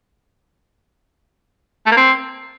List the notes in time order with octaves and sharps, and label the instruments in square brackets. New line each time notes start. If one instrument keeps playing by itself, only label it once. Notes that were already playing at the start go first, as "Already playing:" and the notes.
[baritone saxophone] A3
A#3
C4